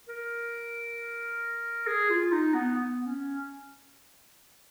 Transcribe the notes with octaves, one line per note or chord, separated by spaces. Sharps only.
A#4
G#4
F4
D#4
B3
B3
C#4